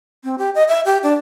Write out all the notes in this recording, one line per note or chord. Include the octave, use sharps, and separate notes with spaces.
C4
G4
D#5
E5
G4
D4